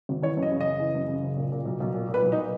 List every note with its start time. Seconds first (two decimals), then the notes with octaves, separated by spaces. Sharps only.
0.09 G#1
0.23 E3 C#5
0.37 F#2
0.42 D#5
0.51 C#3
0.61 D#5
0.66 F#1
0.80 E3
0.95 F#2
1.08 C#3
1.23 F#1
1.37 A#2
1.52 A#2
1.65 B1
1.80 B1
1.94 A#2
2.08 A#2
2.14 B4
2.22 B1
2.32 D#4